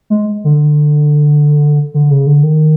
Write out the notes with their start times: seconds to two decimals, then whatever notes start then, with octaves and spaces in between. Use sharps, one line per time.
0.10 G#3
0.44 D3
1.94 D3
2.10 C#3
2.26 D3
2.43 D#3